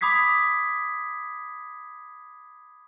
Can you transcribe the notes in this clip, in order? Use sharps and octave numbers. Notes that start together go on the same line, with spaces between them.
B5 D6 D#6 G#6 B6 C7